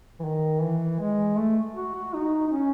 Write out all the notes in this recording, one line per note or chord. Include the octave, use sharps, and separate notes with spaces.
E3
D#3
E3
G#3
A3
F#4
F#4
D#4
D#4
C#4